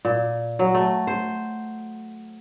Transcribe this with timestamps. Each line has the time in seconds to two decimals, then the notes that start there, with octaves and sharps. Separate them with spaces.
0.05 A#2
0.59 F#3
0.74 A3
1.07 C5